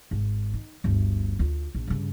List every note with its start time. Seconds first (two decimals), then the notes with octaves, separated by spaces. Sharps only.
0.11 G#1
0.54 D#3
0.84 G1 D2
1.39 D2 F4
1.75 A#1
1.87 G2 C#3